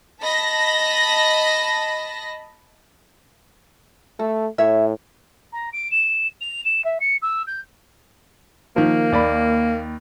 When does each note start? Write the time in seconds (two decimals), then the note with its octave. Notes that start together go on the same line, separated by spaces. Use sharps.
0.22 D#5 A5 B5 A#6
4.19 A3 A4
4.58 A2 C#5 E5
5.52 A#5
5.73 D7
5.91 E7
6.41 F7
6.65 E7
6.84 E5
7.00 C#7
7.22 E6
7.47 G6
8.76 D#3 F3 A#3
9.12 D#2 D5 B5